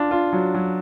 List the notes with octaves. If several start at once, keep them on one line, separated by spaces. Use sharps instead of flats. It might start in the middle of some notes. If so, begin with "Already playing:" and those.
Already playing: D4 F4
F4
F#3
F#3